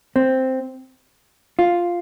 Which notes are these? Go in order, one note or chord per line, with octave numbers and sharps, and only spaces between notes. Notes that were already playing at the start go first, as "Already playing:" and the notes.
C4
F4